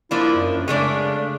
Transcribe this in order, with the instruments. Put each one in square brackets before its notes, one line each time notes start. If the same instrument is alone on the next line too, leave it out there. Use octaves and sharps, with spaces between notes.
[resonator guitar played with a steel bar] F3 A#3 D4 [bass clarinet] E4
[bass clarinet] F#2
[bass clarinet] C#3 [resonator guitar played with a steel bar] G#3 A3 D4